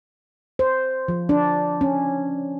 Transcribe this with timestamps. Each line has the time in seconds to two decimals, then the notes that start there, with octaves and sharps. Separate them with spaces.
0.59 C5
1.08 F3
1.29 D4
1.81 C#4